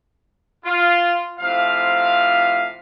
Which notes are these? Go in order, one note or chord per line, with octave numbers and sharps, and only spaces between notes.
F4
A2 C3 F3 F5